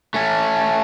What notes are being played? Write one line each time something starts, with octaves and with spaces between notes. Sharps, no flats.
A3 C#4